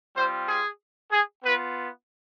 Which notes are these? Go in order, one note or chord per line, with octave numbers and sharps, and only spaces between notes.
G3 C4 F4 C5
G#4
G#4
B3 F4 B4